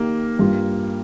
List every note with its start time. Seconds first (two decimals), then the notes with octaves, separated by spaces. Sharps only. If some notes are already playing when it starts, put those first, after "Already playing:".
Already playing: D#3 A#3 G4
0.39 G2 G3 A#3 F4